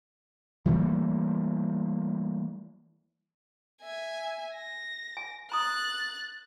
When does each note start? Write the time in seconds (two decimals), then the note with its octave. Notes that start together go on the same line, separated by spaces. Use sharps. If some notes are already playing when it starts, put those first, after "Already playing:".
0.66 E3 G3 A3 A#3
3.82 E5 G#5
4.56 A#6
5.17 G#5
5.52 A#5 D#6 F#6 A6